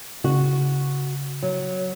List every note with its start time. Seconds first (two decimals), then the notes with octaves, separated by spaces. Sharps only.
0.24 C#3 F#4
1.43 F#3